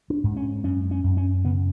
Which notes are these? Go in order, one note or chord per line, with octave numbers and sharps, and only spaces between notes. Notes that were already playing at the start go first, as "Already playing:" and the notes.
D4
G#2
C#4
F#2 C#4
C#4
F#2
C#4
C#3 B3